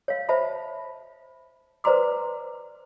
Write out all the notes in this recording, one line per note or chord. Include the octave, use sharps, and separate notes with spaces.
C#5 F5
C5 E5 A5 B5
B4 C5 D5 A#5 C6 D6